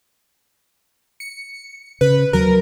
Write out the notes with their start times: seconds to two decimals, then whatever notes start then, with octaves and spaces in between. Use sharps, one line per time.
1.20 C#7
2.01 C#3 B4
2.33 D#2 F#3 A#4